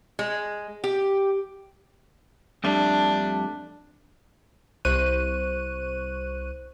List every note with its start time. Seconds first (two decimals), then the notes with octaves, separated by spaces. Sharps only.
0.19 G#3
0.84 G4
2.64 F2 G3 A3 D4
4.85 C2 C5 C#6 F#6 D#7